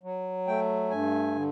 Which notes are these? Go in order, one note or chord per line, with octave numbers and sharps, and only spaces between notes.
F#3
A3 G5
G2 G#5
D3